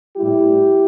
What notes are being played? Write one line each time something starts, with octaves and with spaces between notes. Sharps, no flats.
A2 G3 E4 G4